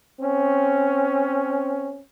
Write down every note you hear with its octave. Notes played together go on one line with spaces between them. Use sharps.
C4 C#4